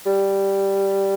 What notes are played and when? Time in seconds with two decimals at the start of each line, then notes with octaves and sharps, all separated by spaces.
0.06 G3